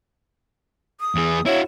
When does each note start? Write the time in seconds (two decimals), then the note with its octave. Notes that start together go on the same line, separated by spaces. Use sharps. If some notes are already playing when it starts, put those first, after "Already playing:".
1.00 D#6
1.15 E2 G#4
1.46 E4 F#4 C#5